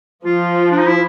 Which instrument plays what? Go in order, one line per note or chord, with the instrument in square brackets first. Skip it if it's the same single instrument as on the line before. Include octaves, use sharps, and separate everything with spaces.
[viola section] F3 [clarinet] F4
[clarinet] D4
D#4
E4